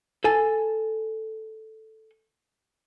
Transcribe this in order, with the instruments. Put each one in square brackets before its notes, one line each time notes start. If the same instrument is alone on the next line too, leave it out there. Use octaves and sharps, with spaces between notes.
[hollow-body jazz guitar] A4 G#5